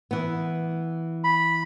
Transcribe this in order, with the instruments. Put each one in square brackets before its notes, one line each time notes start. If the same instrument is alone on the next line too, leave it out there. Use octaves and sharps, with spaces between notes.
[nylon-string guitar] E3 B3
[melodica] B5